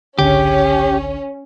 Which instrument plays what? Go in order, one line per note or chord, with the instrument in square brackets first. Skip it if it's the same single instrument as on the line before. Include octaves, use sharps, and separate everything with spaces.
[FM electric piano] G#1 C#2 D3 [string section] C#4 [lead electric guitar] G4